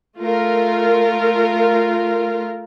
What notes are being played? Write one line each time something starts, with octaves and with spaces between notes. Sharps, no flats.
A3 F4 A#4